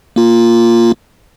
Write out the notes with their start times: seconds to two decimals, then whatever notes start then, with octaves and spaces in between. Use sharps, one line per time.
0.16 A#3 F4